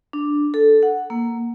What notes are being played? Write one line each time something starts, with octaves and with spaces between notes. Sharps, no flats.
D4
A4
F#5
A#3